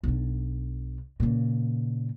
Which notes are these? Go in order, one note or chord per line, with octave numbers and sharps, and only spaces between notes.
B1 D4
A#2 C#3